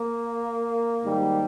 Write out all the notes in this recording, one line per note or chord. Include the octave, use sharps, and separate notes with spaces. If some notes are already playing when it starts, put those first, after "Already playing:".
Already playing: A#3
G#2 D#3 G3